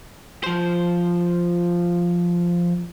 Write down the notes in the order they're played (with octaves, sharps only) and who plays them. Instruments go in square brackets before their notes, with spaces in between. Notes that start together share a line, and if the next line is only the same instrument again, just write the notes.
[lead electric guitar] F3 C5